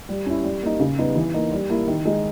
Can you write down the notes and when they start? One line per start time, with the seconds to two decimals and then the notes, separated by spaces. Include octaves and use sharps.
0.09 G3
0.26 C#4 E4
0.44 G3
0.63 A#3 D#4
0.80 C#3
0.99 G3 B3 D#4
1.16 E3
1.34 A#3 D#4
1.52 G3
1.70 A#3 E4
1.88 D#3
2.05 G#3 D#4